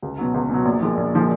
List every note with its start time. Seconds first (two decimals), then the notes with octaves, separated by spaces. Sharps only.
0.02 C#2
0.18 B2 F#3
0.34 C#2
0.50 B2 F#3
0.65 A#1
0.81 A#2 F3 G#3
0.97 A#1
1.13 A#2 F3 G#3